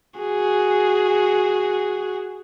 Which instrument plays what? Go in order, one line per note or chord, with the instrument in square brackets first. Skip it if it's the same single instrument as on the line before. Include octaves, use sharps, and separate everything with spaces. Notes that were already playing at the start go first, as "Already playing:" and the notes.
[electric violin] F#4 G#4